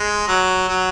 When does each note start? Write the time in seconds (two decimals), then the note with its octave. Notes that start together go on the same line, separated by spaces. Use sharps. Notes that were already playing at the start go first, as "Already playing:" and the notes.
Already playing: G#3
0.27 F#3
0.68 F#3